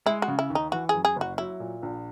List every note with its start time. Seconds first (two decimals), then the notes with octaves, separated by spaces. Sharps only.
0.06 G#3 E4
0.22 F#4
0.28 C#3
0.39 E4
0.50 D#2
0.55 D#4
0.72 E3 F#4
0.89 G#4
0.94 F#2
1.05 G#4
1.16 F#1 F#4
1.38 F#3 E4
1.60 A#2
1.83 A#1